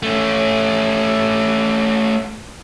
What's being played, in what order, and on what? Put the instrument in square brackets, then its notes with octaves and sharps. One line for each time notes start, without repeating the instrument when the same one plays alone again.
[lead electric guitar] A3 C#4